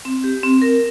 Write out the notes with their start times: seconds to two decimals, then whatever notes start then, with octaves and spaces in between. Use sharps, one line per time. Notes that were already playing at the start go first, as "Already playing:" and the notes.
0.05 C4
0.24 G4
0.43 C4
0.62 A#4